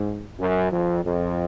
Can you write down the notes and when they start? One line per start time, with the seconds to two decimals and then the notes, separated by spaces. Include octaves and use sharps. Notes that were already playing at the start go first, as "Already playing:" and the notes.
Already playing: G#2
0.39 F#2
0.72 F2
1.04 F2